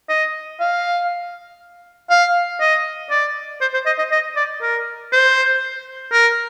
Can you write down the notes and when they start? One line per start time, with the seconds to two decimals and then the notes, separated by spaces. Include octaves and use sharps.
0.09 D#5
0.60 F5
2.10 F5
2.60 D#5
3.10 D5
3.61 C5
3.74 C5
3.86 D#5
3.98 D#5
4.11 D#5
4.36 D5
4.62 A#4
5.12 C5
6.12 A#4